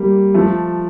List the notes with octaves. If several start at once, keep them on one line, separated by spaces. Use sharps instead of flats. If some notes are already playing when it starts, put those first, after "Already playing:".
Already playing: G3 A#3
F3 A3